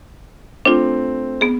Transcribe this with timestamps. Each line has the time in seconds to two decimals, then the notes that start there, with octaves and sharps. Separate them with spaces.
0.65 A3 C4 D4 F4
1.41 B3 G#4